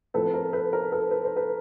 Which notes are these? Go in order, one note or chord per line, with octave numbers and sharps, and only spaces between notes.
A2 F3 A3 C4 A4 B4
A#4 C5
A4 B4
A#4 C5
A4 B4
B4
C5
A4 B4